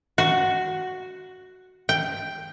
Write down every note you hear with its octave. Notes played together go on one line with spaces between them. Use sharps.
F#4
G5